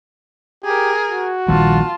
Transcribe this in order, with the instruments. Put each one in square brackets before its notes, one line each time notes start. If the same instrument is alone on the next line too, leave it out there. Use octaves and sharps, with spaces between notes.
[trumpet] G4 [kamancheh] G#4 A#4
[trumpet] F#4
[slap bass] A#1 D#3 G3 [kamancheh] F4 A5